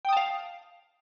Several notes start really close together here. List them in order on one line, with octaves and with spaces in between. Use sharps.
G5 D#6 A5 F5